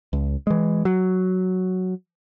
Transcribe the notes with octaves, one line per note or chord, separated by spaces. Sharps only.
C#2
E3 G#3
F#3